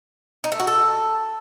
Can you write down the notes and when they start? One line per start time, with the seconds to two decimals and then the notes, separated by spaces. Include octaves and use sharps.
0.44 D#4
0.52 A3
0.60 F#4
0.67 A4